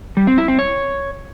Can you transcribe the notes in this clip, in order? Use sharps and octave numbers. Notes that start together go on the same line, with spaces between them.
G3
C4
E4
C4
C#5